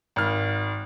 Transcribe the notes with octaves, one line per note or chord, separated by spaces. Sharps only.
G#1 F6